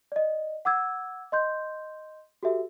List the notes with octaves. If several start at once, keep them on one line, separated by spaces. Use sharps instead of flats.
D5 D#5
F#5 D6 E6 G#6
D#5 C6 G6
F#4 G4 A4 E5